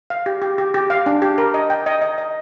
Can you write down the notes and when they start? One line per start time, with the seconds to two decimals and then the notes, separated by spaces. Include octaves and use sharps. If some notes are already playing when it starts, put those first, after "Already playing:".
0.10 F5
0.26 G4
0.42 G4
0.58 G4
0.74 G4
0.90 F5
1.06 D4
1.22 G4
1.38 A#4
1.54 D#5
1.70 G5
1.86 D#5
2.02 D#5
2.18 D#5